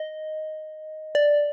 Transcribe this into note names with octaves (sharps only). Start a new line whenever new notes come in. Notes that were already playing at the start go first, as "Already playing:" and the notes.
Already playing: D#5
D5